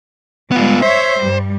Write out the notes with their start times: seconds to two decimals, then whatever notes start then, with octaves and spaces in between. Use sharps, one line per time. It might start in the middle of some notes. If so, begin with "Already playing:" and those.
0.52 G3 G#3 B3 F4
0.82 C5 C#5 E5
1.20 G2 G3